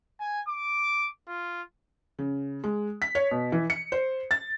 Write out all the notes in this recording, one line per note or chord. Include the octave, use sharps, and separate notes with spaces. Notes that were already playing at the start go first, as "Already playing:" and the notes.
G#5
D6
F4
C#3
G#3
B6
C#5
B2
E3
C#7
C5
A6